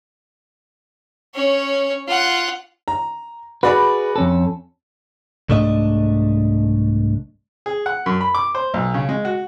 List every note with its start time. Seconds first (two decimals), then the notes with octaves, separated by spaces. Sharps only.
1.34 C#4 C#5
2.07 F4 F#5
2.88 A#5
3.63 F#4 G#4 B4 D5 B5
4.16 F2 C#4 A4
5.49 C2 G#2 A3 D4 D#5
7.66 G#4
7.86 F#5
8.06 F#2
8.21 B5
8.35 D6
8.55 C5
8.74 B1
8.94 C#3
9.09 G#3
9.25 F#4